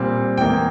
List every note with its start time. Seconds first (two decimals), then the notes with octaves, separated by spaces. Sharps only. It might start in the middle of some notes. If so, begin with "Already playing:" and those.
Already playing: A#2 G3 C4
0.37 E2 E3 A#3 G5